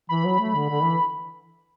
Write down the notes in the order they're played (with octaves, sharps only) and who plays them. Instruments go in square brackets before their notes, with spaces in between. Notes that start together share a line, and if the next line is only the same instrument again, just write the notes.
[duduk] E3 [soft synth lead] B5
[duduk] F#3
A3
D3
D3
E3